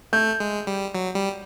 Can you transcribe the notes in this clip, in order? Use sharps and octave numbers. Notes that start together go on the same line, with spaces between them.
A3 G6
G#3
G3
F#3
G3